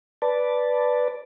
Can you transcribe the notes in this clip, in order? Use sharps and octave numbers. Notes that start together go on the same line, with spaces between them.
B4 D5 A5